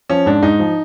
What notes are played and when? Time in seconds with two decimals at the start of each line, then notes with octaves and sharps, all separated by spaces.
0.09 F3 C#4
0.26 G#2 D4
0.43 G#2 D#4
0.59 F3